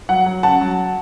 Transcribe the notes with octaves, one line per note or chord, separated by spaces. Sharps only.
F#3 F#5
F#3
C#3 F#5 A5
F#3